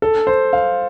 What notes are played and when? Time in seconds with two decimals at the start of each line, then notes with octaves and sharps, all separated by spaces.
0.02 A4
0.27 C5
0.53 F5